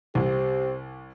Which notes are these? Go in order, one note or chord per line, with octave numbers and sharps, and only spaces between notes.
C2 C4 G4